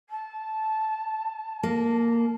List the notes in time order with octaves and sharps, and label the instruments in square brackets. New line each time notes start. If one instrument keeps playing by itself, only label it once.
[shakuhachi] A5
[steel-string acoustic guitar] A#3